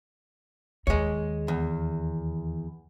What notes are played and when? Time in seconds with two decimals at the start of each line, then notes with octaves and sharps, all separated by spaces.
0.87 D#2 G#3 C#5
1.48 E2